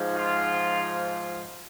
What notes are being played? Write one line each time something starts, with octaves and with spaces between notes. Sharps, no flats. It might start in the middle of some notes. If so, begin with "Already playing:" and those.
Already playing: G#2 F3
F4